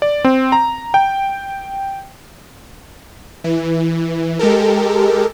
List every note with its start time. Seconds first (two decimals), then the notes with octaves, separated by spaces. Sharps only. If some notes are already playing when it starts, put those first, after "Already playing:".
0.02 D5
0.24 C4
0.52 A#5
0.94 G5
3.44 E3
4.39 G#3 G4 A4 A#4